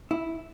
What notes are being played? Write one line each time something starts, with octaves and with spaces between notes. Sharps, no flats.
E4